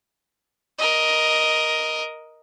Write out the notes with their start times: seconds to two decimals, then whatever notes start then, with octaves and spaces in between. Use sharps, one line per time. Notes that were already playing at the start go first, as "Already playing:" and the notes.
0.78 A#4 D#5